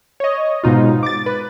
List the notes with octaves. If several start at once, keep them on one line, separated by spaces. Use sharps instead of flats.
C#5 D#5
G#2 B2 D#4 F4
D6 A6
B4